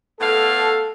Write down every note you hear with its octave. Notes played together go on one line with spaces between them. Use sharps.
A2 B3 A4 F5